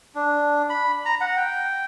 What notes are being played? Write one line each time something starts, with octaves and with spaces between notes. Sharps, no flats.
D4
B5
A#5
F#5
G5